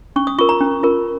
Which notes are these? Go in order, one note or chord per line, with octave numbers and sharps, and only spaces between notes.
C#4 C#6
D#6
F4 A#4 C#6
A#5
C#4
F4 A#4